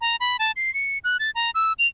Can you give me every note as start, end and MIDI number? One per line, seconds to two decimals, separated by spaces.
0.01 0.16 82
0.20 0.37 83
0.39 0.52 81
0.56 0.73 96
0.74 0.98 97
1.04 1.17 90
1.19 1.31 93
1.35 1.51 82
1.55 1.73 88
1.79 1.87 101